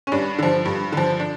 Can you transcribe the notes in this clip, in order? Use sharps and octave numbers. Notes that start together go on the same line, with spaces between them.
C#4
G2 D4
D3 F3
G2
D3 F3
D4